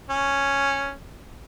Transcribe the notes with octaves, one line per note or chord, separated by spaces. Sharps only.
C#4